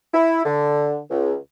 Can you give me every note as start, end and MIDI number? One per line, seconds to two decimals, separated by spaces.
0.14 0.41 64
0.46 0.98 50
1.10 1.35 37